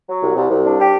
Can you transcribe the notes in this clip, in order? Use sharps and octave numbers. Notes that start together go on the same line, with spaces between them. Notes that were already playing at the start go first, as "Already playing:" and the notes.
F#3
C2
C2
C2
D4
G3 G4